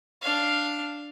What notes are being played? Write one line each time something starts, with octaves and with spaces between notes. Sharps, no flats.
D4 F5